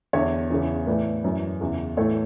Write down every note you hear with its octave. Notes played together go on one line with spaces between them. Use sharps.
E2 D3 C#5 E5
E2 C#3 E3
A2 E3 B4 D5
F#2 E3
E2 C#3 E3
A2 E3 A4 C#5